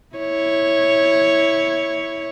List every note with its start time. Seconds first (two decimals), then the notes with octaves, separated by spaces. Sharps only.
0.16 E4 C#5